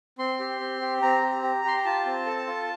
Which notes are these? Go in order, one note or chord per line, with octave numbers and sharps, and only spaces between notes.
C4 C6
G4
C4
G4
C4 A#5
G4
G4
G4 C6
A#5
F4 A5
C4
A4
F4